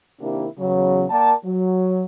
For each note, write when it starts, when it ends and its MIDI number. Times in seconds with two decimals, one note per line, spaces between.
0.20 0.46 48
0.20 0.46 51
0.20 0.46 58
0.20 0.46 62
0.20 0.46 64
0.20 0.46 67
0.58 1.04 40
0.58 1.04 49
0.58 1.04 54
1.10 1.33 58
1.10 1.33 70
1.10 1.33 74
1.10 1.33 79
1.10 1.33 81
1.45 2.04 54